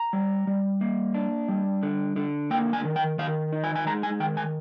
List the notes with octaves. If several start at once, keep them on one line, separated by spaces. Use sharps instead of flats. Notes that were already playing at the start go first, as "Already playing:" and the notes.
Already playing: A#5
G3
G3
A#3
D4
G3
D3
D3
A#3 G5
G#5
D#3
G5
D#3 F5
D#4
G#5
G#5
G#3 A#5
G#5
D#3 G5
G#5